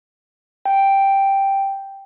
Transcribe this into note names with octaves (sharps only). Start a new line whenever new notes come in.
G5